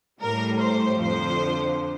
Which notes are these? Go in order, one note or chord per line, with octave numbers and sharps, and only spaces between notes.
A2 G3 A#4
C5
F2 D3 F3 C5